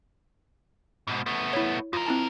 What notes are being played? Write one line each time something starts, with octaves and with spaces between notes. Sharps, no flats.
G#2 B2
A3 B3
E4 C#5
F2 F4 A#4
C4 E4 A5